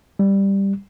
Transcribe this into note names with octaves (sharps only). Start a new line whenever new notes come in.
G3